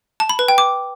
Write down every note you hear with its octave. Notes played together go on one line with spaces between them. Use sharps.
A5
B5
B4
G5
D6